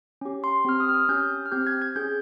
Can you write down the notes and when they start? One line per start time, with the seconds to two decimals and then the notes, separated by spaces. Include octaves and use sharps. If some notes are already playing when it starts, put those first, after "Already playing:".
0.21 C#4 G4
0.44 C6
0.65 C4 G4 F6
0.80 D#6
0.89 F6
0.94 D#6
1.09 C#4 G4 G6
1.46 F6
1.52 C4 G4 G6
1.67 G#6
1.82 G#6
1.96 C#4 G#4 G6